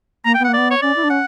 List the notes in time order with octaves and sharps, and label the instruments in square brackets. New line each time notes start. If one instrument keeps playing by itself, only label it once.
[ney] A#3 [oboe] A#5
[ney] B3 [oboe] G5
[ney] A#3 [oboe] F#5
[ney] B3 [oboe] D5
[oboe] C#5
[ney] C#4 [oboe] D5
[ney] E4
D4
[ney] C#4 [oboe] F#5